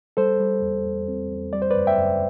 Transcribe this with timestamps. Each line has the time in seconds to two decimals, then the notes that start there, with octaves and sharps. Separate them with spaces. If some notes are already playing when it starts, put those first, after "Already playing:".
0.17 G3 A4 C5
0.40 G3
0.62 E2
0.85 E2
1.08 C4
1.31 E2
1.53 G3 D5
1.62 C5
1.70 B4 D5
1.75 F#2
1.87 E5 G5
1.98 F#2